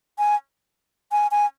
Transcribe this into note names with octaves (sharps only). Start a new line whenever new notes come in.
G#5
G#5
G#5